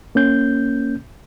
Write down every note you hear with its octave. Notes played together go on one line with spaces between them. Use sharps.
A#3 C#4 G6